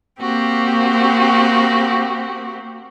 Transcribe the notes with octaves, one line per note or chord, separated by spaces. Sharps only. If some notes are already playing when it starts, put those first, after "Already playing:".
A#3 C4 F#4 G4